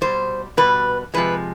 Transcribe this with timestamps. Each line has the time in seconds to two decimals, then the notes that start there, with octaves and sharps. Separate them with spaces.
0.01 B2 G3 C5
0.57 B2 G3 B4
1.14 C3 F3 G#3 B4